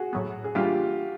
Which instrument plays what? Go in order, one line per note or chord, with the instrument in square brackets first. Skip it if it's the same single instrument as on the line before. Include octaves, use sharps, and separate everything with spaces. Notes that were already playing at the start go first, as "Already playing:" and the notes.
Already playing: [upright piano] F#4 G#4
[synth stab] A2 F#3 B3
[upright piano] G#4
[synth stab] E3 G3 A#3 D4 [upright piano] F4 G4